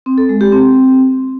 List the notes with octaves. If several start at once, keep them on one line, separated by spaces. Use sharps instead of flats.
C4
A4
G#3
G4
C4